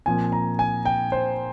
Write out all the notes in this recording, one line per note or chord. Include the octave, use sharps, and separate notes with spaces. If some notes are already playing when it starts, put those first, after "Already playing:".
A#2 F3 C4 G#5
A#5
G#5
G5
C5